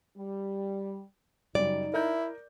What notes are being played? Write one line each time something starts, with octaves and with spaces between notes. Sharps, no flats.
G3
F#2 C#3 G3 D#4 D5
E4 A#4 D#5 G6